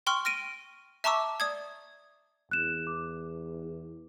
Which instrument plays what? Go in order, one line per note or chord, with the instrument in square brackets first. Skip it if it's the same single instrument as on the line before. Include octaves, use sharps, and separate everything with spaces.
[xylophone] G5 C6 C#6 F6
F6 A#6 D7 D#7
E5 A5 A#5 C#6 D6 E6
D5 D#6 G#6
[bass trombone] E2 [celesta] F#6 E7
[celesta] D6